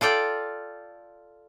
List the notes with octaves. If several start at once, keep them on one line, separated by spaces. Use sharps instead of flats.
F4 A4 D5 G5